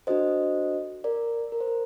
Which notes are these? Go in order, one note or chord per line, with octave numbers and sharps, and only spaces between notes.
D4 F#4 A4 C5 D#5
A#4 D5
A#4
C5
A#4